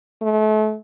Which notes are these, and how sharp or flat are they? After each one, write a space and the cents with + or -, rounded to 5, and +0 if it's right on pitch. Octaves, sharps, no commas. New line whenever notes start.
A3 -35